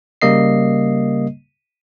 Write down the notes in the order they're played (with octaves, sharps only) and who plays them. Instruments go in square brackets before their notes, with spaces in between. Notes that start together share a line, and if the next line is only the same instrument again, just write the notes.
[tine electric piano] C#3 G3 A#3 D#5 C7